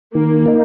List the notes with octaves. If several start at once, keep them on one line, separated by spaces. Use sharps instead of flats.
D#3 A#3
A#3 D#4